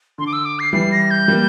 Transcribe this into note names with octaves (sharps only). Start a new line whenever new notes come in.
D3 C6
D6
E6
D6
C7
E3 G3 C7
A#6
G6
G3 A#3